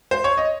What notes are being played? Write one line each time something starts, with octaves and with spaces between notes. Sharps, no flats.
C5
C#5
D#5